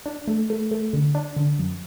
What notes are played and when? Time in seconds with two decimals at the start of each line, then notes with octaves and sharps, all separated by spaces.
0.06 D4
0.28 A3
0.50 A3
0.71 A3
0.93 D3
1.15 D4
1.36 D3
1.59 F#2